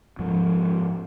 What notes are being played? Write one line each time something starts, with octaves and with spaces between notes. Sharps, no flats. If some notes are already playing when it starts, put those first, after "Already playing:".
G#2 F3